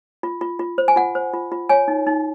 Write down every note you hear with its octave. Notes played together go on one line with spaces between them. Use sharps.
F4
F4
F4
C5
G#5
F4 F#5
C5
F4
F4
C#5 G#5
D#4
D#4